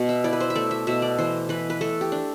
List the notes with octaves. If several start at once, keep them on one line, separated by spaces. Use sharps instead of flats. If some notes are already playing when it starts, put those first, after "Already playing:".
Already playing: B2
E5
E4 D5
B4
C5
E5
A3 D5
E5
B2 E5
D5
E3 C5
E3 B4
B4
A3 A4
G4
D4